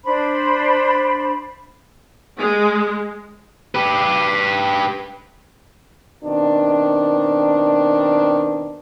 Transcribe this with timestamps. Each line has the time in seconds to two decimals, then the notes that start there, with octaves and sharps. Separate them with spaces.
0.05 D4 C5 B5
2.37 G#3
3.75 G4 B4
6.22 B2 D#3 C4 D4